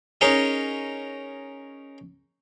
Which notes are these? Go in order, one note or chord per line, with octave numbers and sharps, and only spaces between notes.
C#4 D#4 G#4 A#4 C#5 D#5